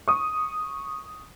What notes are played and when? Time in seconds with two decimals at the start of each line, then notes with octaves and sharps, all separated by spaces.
0.08 C#6 D#6